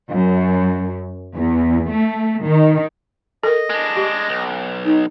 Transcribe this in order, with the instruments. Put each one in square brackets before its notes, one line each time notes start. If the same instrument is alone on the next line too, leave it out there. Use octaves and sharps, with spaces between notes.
[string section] F#2
E2
A3
D#3
[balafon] A4 A#4 [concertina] D#5
[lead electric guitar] G#3 D4
[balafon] G4
[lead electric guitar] B1
[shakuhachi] D#4